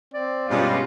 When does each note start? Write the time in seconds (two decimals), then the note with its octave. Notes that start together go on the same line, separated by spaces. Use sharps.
0.14 C4 D5
0.50 G2 B2 G3 G#3 C#4 F4